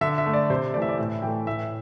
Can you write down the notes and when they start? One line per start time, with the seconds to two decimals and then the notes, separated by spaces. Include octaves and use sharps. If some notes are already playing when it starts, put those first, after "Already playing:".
0.01 D3 E5
0.18 E5
0.26 A3
0.33 D5
0.50 C3 C5
0.74 A3 D5
0.77 E3 E5
0.89 D5
0.99 A2 E5
1.22 E3 A3 G5
1.46 A2 E5